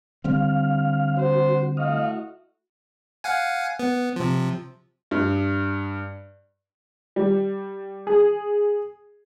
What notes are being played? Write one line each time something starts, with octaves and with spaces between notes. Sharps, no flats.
D3 G3 C4 F5
F#4 C5
A3 E4 F#4 D#5 F5
F5 F#5 G#5
B3
C3 F3
G2
G3
G#4